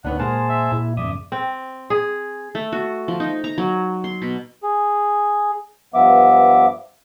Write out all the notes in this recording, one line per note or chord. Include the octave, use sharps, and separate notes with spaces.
D2 D#3 B3 D4 C#5 F#5
A#2 G#3 G#4 A#4 C5 F#5 A5
E5
A#2 E4
F2 G#2 C#3 D5 E5 D#6
C4
G#4
A3
F#4
F3
D#4
A#5
F#3
C6
B2
G#4
G2 F3 B3 E5 D6